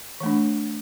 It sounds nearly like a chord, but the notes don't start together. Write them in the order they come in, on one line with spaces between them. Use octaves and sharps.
E3 A3 D4